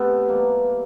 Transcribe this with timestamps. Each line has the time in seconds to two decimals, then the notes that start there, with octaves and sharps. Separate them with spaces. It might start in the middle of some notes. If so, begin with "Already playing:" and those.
Already playing: C3 A3 B3
0.28 E3 G3 A#3